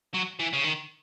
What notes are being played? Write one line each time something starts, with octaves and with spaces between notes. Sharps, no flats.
F#3
E3
C#3
D#3